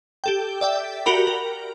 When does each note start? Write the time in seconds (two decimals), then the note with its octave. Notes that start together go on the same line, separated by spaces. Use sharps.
0.24 G4 A4 G5
0.61 D5 E5 G5
1.06 F#4 G4 A#4 B5
1.27 A#4